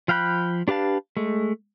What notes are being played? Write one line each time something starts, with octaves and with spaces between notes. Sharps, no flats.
F3 F5 G5 B5 F#6
D4 G4 B4 F5 A5
G#3 A3